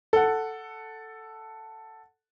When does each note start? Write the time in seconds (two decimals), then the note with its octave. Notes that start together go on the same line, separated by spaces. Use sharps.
0.13 A4 F#5